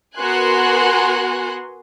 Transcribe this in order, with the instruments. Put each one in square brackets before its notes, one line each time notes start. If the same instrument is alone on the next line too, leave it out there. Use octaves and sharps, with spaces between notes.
[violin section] B3 F#4 A#4 G#5 C6 F#6